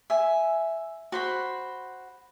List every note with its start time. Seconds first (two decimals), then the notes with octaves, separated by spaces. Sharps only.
0.10 E5 G#5
1.12 F#4 C5 B5